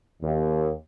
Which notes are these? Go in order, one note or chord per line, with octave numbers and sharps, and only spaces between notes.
D#2